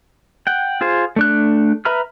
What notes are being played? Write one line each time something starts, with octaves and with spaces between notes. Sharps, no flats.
F#5 G5
F4 G#4 C5
A3 D4 F#6
B4 E5 A#5 B5 F6